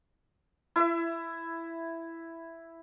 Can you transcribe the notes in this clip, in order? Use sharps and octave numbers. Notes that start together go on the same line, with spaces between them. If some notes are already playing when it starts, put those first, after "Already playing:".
E4 E5